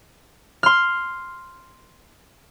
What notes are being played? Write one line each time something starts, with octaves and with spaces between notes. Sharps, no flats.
C6 F6